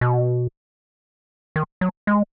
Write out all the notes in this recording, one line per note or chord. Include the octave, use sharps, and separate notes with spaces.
B2
D#3
F#3
G#3